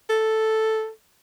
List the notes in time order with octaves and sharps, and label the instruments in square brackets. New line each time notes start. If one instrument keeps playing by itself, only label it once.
[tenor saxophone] A4